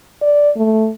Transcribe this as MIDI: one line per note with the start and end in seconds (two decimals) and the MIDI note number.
0.22 0.51 74
0.56 0.90 57